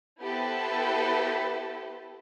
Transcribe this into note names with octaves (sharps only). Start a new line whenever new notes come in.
B3 E4 G4 A4 B4 C5